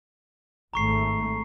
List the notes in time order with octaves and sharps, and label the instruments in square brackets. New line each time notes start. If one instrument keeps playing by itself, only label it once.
[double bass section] G#1 A3 [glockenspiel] A#5 C#6 C7